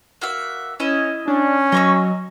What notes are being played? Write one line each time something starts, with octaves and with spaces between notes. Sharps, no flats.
A#3 F#4 E5
C#4 E4 D#5
C#4 D4
F#3 D#5 C#6 E6